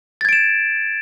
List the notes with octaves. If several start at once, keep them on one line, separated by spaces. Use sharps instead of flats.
G#6 A6 D7 E7